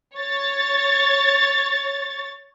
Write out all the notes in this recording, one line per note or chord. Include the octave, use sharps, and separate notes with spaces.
C#5 A6